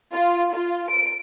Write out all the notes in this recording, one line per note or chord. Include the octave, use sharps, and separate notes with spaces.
F4
F4
D7